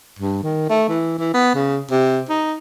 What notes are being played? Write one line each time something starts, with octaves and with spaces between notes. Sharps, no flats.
G2
D#3
A3
E3
E3
B3
C#3
C3
D#4